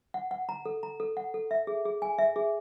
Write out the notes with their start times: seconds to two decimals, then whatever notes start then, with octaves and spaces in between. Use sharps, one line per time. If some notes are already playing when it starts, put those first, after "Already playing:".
0.14 F#5
0.31 F#5
0.49 A#5
0.66 A4
0.83 A#5
1.00 A4
1.17 F#5
1.34 A4
1.51 E5
1.67 G#4
1.85 G#4
2.02 G#5
2.19 E5
2.36 G#4